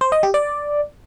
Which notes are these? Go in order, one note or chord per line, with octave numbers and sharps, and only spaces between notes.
C5
D#5
G4
D5